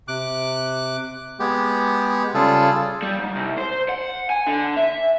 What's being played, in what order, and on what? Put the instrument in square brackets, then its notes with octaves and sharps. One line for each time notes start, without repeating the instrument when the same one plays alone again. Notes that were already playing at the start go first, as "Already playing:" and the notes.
[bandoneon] C3 D6 F#6
[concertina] G#3 G4 [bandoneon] B3
[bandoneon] C#3 G3 [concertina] F4 G#4 A4
[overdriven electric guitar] G3
G#2
C2
C5
F#5
G#5
D3
E5